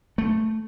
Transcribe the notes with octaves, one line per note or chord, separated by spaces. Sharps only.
A3